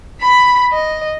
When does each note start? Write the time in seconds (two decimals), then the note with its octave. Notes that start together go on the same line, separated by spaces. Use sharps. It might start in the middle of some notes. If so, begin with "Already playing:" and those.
0.21 B5 B6
0.73 D#5